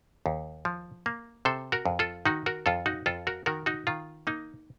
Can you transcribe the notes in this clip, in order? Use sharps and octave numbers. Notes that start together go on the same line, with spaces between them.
D#2
F3
A#3
C3 A4 C5
F#4 A#4
F2
F4 A4
D#3 D#4 F#4
F#4 A#4
F2 F4 A4
D#4 F#4
F2 F4 A4
F#4 A#4
D#3 F#4 A#4
D#4 F#4
D#3 F4
A#3 D#4